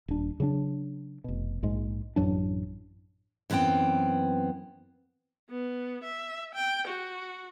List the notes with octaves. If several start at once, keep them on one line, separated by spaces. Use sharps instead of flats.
D#1 D4
C#3 F#3 C#4 D4
F1 B2
A#1 G#2 G#3
A1 F#2 F#3 D4
F#2 E3 B3 C4 G5
B3
E5
G5
F#4